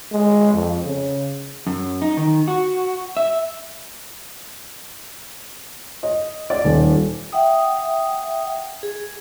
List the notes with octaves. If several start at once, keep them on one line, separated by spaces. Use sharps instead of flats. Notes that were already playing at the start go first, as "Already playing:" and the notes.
G#3
F2
C#3
F#2
D#4
D#3
F#4
E5
D#5
D5
D#1
E5 F#5 G5 D#6
G#4